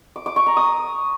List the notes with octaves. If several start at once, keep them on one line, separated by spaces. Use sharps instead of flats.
D6
D6
C#6
A#5
D#6